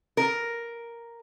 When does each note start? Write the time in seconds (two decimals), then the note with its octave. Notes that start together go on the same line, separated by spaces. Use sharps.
0.17 A#4